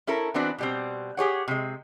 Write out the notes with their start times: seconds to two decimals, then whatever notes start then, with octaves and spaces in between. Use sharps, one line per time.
0.07 C#4 E4 A4 A#4
0.34 E3 B3 C4 D4 F#4
0.58 B2 G3 C4
1.17 G4 G#4 C#5 F#5
1.48 C3 G#3